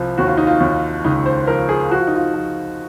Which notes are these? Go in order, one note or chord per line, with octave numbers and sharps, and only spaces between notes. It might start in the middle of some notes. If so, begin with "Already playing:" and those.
Already playing: C2 F3
D#2 F#4
F4
D#4
F4
D#2
C#2 D#4
C5
F3 A#4
G#4
F3 F#4
F4
D#4
F4
F3